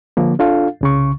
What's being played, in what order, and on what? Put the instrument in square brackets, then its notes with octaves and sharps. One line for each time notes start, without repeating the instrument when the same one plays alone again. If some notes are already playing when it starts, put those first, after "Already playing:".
[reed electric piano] D3 F3 A#3
D4 F4 A4 F5
C2 C#3 C#6